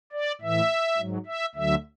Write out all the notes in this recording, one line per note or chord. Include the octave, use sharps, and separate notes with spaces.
D5
A2 E3 E5
G#2 F#3
E5
D2 D3 F#3 E5